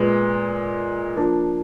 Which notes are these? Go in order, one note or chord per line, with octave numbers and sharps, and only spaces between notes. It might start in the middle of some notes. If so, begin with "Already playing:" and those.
Already playing: A#2 G#3 B3
F3 A#3 D4